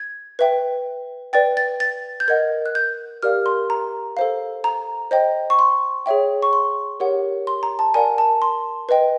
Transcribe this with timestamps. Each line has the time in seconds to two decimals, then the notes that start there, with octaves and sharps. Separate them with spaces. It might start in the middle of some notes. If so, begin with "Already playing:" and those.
Already playing: G#6
0.39 B4 E5 G5
1.33 B4 D5 G5 A6
1.57 A6
1.80 A6
2.20 G6
2.28 A#4 D#5 F#5 G#6
2.66 F#6
2.75 G6
3.23 G4 A#4 D5 F5 F6
3.46 C6
3.70 A#5
4.17 A4 C5 F5
4.64 A#5
5.11 C5 D#5 G5
5.50 C#6
5.59 C6
6.06 G#4 C#5 E5 G5
6.42 C#6
6.53 C6
7.00 G4 A#4 C#5 F#5
7.47 C6
7.63 A#5
7.79 A5
7.94 A#4 D5 F#5 G#5
8.18 A5
8.42 C6
8.89 B4 D#5 G5